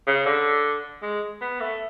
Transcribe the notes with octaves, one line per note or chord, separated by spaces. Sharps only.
C#3
D3
G#3
B3
A3